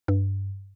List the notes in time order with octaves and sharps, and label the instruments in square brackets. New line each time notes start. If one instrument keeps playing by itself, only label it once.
[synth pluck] G2